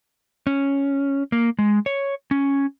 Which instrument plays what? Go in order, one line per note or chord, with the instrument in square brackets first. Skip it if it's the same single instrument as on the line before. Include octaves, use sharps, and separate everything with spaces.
[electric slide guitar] C#4
A#3
G#3
C#5
C#4